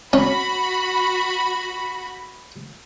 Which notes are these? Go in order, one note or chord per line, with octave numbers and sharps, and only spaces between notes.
C#4 F#4 B5